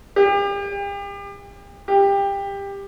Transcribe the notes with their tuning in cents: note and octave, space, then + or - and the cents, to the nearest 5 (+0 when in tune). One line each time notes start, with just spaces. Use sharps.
G4 +40
G4 +20